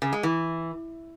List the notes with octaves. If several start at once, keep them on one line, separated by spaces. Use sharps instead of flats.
C#3
G#3
E3